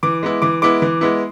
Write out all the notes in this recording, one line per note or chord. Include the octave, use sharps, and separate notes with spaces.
E3 D6
G#3 B3 E4
E3 D6
G#3 B3 E4 D6
E3
G#3 B3 E4